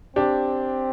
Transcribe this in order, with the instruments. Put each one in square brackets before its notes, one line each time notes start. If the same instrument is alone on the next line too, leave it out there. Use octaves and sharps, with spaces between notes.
[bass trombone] C4 [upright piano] D4 G4